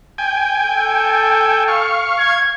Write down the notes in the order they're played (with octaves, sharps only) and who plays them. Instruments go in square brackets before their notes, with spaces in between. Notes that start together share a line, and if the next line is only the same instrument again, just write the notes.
[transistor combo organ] G5 G#5
[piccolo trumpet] A4
[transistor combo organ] F5 C#6
[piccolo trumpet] G#6